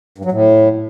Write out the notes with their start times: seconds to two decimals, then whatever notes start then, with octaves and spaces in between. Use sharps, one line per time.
0.18 G2
0.25 F#3
0.32 A2